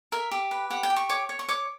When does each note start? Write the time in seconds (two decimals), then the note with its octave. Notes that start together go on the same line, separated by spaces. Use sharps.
0.12 A#4 E5
0.31 G4
0.51 B4
0.70 G4 F#5
0.83 G5
0.90 G4
0.96 C#6
1.09 C#5 D6
1.29 C#5
1.39 C#6
1.48 C#5 D6